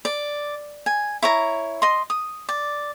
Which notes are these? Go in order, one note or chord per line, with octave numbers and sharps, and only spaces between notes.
D5
G#5
E4 C#5 A#5
D#5 C6
D#6
D5